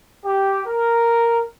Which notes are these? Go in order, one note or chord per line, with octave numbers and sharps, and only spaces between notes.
G4
A#4